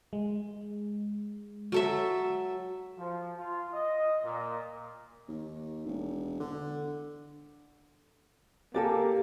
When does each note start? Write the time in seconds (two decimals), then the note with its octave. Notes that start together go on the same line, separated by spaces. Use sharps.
0.13 G#3
1.72 F#3 A4 E5
2.97 F3
3.39 F4
3.73 D#5
4.23 A#2
5.28 D#2
5.86 E1
6.40 D3
8.74 A#3 G4 A4 A#4 D5 G#5